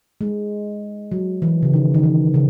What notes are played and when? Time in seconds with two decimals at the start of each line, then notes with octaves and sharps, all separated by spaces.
0.21 G#3
1.12 F#3
1.42 E3
1.63 C#3
1.73 D#3
1.94 D#3
2.03 E3
2.34 C#3